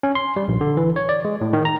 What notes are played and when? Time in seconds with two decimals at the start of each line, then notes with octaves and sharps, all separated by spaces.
0.03 C#4
0.15 C6
0.36 G3
0.48 A#1
0.61 D3
0.77 E3
0.96 C#5
1.09 D5
1.25 G#3
1.41 A2
1.53 D#3
1.65 A#5